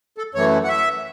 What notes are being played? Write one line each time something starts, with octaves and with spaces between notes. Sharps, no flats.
A4
F#2 E3 A3 C#5
F#5
E5